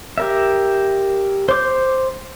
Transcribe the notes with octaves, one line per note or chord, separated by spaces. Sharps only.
G4 A#4 E5
C5 D6 G6